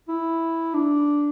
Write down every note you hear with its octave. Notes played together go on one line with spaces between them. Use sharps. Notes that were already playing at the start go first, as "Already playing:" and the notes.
E4
D4